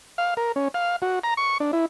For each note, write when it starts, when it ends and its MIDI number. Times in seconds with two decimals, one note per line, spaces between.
0.18 0.34 77
0.37 0.52 70
0.56 0.68 61
0.74 0.96 77
1.02 1.19 66
1.24 1.34 82
1.37 1.58 85
1.60 1.71 62
1.73 1.86 64